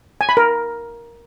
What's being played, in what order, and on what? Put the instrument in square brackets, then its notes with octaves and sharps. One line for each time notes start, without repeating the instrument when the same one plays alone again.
[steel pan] G#5
B5
A#4